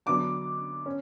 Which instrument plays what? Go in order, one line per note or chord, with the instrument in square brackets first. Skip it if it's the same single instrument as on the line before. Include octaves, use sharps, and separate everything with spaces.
[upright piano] D3 F#3 B3 D4 D6
C#4